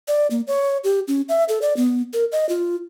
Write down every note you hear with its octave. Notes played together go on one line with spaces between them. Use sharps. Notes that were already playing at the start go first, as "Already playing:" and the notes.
D5
A#3
C#5
G4
C#4
E5
A4
D5
B3
A#4
D#5
F4